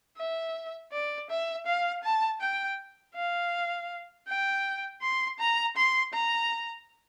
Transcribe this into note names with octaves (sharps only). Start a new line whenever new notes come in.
E5
D5
E5
F5
A5
G5
F5
G5
C6
A#5
C6
A#5